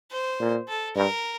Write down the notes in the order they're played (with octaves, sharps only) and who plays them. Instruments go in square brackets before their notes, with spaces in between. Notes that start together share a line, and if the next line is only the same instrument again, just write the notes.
[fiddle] C5
[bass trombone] A#2
[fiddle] A4
[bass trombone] G2 [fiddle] A#4